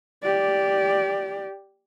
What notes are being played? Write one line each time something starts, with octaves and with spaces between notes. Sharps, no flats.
G4 D5